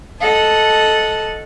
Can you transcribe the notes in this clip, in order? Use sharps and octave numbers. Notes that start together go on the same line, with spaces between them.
A4 D#5 F#5 A5